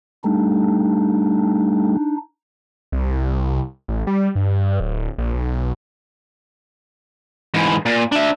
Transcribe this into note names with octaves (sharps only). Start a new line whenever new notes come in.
G3 A3 D4 D#4
C2
A1
G3
G2
D1
A#1
B1
G#2 E3
A#2
D4 E5